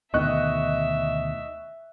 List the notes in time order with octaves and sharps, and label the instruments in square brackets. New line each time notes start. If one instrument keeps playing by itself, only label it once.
[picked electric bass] D2 B2 D#3 [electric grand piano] D#5 C#6 F#6 [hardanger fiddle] E5